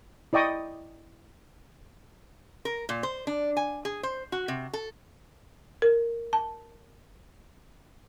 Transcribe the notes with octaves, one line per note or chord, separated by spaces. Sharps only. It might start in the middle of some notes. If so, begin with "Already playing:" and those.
E4 D5 D#5 G5 C#6 D#6
A#4
A#2
C5
D4
G#5
G#4
C5
F#4
C3
A4
A#4
A5